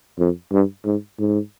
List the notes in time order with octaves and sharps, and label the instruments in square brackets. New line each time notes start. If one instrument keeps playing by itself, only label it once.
[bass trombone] F2
G2
G#2
G#2